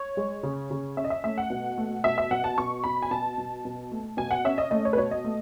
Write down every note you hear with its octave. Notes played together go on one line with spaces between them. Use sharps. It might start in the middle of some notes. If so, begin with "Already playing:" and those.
Already playing: C#5
G#3
C#3
C#3
C#4 E5
D#5
E5
A3 E5
F#5
B2
A3
B2 E5
E5
B2 F#5
A5
B2 C#6
B2 B5
G#5
B2 A5
B2
B2
A3
B2 G#5
F#5
C#4 E5
D#5
A3 D#5
C#5
B4
B2 C#5
D#5
A3